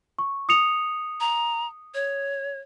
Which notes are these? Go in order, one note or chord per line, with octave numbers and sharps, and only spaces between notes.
C#6
D#6 C#7 F7
A#5
C#5